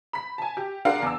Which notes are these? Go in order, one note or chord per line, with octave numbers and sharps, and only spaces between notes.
B5 B6
G#5 A5
G4
G#3 D4 A#4 F5 F#5
E2 D6 E6